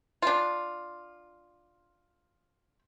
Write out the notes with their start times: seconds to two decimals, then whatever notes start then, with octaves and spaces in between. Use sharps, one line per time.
0.22 D4 F4